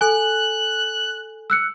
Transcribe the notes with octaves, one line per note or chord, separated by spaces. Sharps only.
A4 G#5 F#6
E6 F#6 C#7